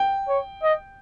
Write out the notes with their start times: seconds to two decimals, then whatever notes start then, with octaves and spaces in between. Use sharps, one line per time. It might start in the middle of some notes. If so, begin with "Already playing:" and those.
Already playing: G5
0.28 C#5
0.63 D#5